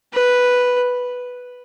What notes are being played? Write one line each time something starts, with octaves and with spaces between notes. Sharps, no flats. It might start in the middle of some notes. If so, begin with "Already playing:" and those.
B4